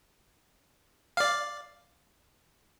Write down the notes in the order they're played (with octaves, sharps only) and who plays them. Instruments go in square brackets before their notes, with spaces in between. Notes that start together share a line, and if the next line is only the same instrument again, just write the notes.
[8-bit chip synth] D5 F5